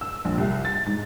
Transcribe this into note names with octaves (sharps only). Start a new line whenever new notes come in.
E6
A#1
C2
A6
G#2